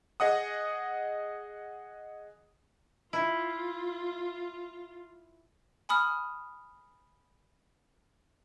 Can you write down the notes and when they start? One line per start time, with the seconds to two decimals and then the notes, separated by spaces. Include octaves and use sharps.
0.20 G#4 D#5 F#5 D#6
3.13 E4 F4
5.89 G#5 B5 D#6 F6